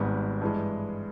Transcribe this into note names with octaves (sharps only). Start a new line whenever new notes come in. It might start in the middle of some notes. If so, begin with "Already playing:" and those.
Already playing: G#1 G#2 G3 B3
G2 E3 G#3